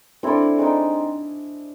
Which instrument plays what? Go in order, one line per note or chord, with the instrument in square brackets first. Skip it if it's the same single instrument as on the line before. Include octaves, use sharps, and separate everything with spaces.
[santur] C4 E4 A4 D5 [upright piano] D4
[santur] G#3 C4 D#4